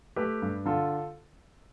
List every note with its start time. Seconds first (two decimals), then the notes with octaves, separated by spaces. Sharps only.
0.16 A3 G4 B4
0.42 G2
0.65 D3 F4 A4